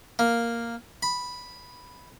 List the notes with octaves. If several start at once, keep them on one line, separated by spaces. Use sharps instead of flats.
A#3
B5